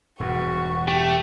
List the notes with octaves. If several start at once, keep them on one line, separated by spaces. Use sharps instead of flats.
E1 G2 B2 F#4 C#6
A3 G4